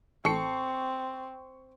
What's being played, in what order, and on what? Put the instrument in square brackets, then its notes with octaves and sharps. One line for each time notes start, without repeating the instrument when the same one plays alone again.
[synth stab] A1 [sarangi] C4 [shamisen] A4 [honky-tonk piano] C#6 C7 C#7